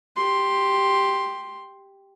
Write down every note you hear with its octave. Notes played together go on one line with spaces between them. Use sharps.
G4 C6